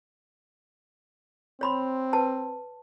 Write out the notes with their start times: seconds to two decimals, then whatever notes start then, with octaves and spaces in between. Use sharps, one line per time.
1.61 C4 C#5 B5 C6
2.13 B4 A5